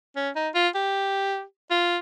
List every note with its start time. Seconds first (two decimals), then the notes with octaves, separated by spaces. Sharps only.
0.16 C#4
0.35 D#4
0.55 F4
0.75 G4
1.71 F4